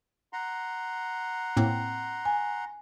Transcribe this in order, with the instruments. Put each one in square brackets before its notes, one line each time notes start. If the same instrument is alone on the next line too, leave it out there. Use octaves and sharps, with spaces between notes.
[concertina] F#5 A#5 C6
[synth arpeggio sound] A2 A#3 C4
[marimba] G#5